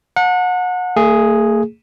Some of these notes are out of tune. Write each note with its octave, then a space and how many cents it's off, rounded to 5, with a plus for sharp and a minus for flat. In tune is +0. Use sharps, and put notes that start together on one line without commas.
F#5 -30 A5 +35
A3 +45 G#4 +0